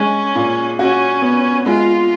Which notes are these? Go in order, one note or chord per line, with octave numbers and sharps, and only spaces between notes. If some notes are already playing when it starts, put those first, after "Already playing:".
Already playing: G#3 C#4
A#2
C#4 F#4
B3
G#3 F4